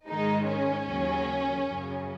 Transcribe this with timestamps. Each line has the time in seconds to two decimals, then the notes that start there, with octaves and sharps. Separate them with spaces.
0.09 G#2 D#3 G#3 D#4
0.48 C#4
0.86 D#2 C#3 F#3
1.64 F#2 C#3 F#3